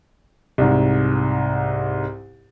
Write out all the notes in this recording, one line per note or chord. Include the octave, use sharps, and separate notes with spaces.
C2 G#2